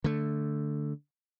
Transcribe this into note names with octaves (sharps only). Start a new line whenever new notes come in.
D3 A3